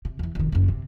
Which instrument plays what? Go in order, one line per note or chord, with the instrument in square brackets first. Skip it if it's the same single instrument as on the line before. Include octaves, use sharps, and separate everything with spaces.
[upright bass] C3
E2 E3
F1 D#3
F#1 F#2
C3